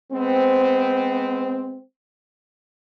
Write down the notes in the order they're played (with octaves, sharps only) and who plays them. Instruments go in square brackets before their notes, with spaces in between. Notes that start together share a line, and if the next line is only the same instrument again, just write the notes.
[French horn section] G#3 B3 C4